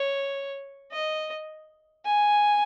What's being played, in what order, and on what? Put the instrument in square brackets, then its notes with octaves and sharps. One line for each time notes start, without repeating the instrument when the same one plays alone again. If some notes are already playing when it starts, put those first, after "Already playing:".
Already playing: [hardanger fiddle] C#5
D#5
G#5